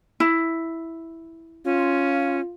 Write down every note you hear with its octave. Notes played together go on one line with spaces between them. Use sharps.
E4
C#4 F4